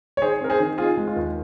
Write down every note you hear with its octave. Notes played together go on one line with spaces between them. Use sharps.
C#5
D#3 G#4 C5
C4 A#4
G#4 C5
D#3
C4 F4 G#4
G#3
F4
D#2